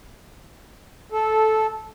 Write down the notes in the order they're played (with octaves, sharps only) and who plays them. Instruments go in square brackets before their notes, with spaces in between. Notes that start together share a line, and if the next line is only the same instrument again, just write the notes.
[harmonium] A4